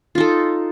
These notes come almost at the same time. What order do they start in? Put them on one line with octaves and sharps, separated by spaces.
F4 D#4 A4